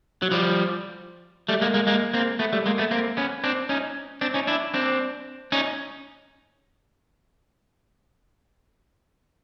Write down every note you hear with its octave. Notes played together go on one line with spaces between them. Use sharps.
F#3
F3 G3
G3 A3
G#3 A#3
G#3 A#3
G#3 A#3
A#3 C4
A3 B3
G3 A3
G#3 A#3
A3 B3
A#3 C4
B3 C#4
C4 D4
C#4 D#4
C4 D4
C#4 D#4
D4 E4
C4 D4
C#4 D#4